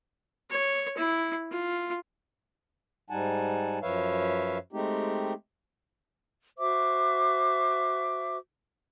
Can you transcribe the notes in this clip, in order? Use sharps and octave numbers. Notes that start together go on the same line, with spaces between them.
C#5
E4
F4
G#2 G3 D#4 F#5 G#5 A5
F#2 F3 B4 C#5 E5 F5
G#3 A3 C4 D#4 G4
F#4 C5 E5 D6